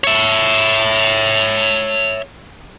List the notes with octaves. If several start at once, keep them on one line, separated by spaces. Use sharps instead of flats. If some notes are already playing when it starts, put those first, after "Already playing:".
C#5 E5